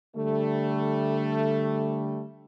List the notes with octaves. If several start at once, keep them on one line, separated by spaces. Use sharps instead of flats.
D3 G3 A3